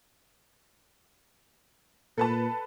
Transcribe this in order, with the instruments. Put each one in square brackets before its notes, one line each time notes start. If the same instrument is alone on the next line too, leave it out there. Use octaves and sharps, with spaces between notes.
[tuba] A#2 [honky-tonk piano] A4 B4 A5